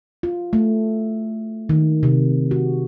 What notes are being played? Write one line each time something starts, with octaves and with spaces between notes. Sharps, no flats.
F4
A3
D#3
C3
F#4